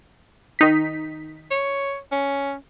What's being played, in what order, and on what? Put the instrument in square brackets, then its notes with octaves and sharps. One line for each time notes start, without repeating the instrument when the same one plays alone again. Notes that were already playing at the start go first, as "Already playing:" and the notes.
[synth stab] D#3 D#4 B6
[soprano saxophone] C#5
C#4